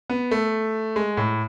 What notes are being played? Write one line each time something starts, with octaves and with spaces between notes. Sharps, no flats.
B3
A3
G#3
A2